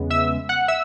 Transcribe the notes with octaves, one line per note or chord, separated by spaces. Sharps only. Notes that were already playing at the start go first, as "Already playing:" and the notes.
Already playing: E2 C#3 G#3 B3
E5 E6
F#5 F#6
E5 E6